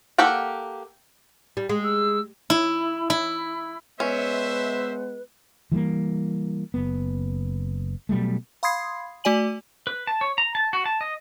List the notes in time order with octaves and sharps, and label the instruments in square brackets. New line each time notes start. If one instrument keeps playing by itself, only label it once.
[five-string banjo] A#3 G4 A4 F#5 G5
[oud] G3
G#3
[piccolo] E6
[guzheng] E4
E4
[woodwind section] G#3 B3 [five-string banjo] C#4 [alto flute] B4 [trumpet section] C5 E5
[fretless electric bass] E3 G3 G#3 A#3
F#1 B3
B2 F#3 G3 A3
[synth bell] F5 B5 C6 D#6 G#6 C7
A3 F#4 D5 G#5 D#7 F#7
[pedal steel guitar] B4
A5
C#5
A#5
A5
F#4
A5
D#5